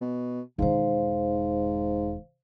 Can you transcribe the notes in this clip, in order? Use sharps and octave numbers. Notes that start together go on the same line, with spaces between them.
B2
E1 G#2 D#3 C5 F5